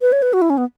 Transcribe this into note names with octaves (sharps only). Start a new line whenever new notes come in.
B4
C#5
B4
F#4
E4
C#4
B3